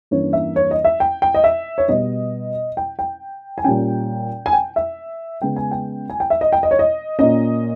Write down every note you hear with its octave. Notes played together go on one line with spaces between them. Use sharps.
G2 E3 A#3 C#4 C#5
E5
C#5
D#5
E5
G5
G5
D#5
E5
C#5
B2 G3 B3 D#5
G5
G5
G#5
A#2 G3 C#4 G5
G#5
G5
E5
C#3 G#3 B3 G5
G#5
G5
G#5
G5
E5
D#5
G5
D#5
C#5
D#5
A#2 A#3 C#4 D#5